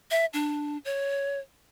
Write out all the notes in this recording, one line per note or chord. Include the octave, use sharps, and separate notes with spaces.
E5
D4
C#5